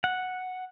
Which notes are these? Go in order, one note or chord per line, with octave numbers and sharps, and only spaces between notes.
F#5